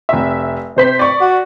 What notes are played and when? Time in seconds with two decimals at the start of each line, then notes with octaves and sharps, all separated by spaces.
0.09 F1 E5
0.76 C3 C5 B6
0.99 D5 C#6
1.21 F#4